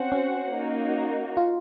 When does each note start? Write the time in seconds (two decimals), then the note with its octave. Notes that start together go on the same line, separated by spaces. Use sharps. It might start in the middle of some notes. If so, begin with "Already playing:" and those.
Already playing: C4 C#4 F#4 C5 F#5
0.12 C#4
0.53 A#3 D#4 F#4
1.37 F4